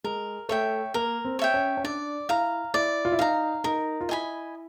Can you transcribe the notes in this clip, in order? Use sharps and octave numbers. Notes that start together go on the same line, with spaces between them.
G#3 A#4
A3 C#5 E5 G5
A#3 A#4
C4
C#5 E5 G5
C#4
C#4
D4 D5
E4 F5 A#5
E4 D5
F4
E4
D#4 F5 A#5
D#4 A#4
F4
E4 D#5 G#5 B5